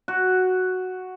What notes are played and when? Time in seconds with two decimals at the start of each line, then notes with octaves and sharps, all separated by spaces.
0.08 F#4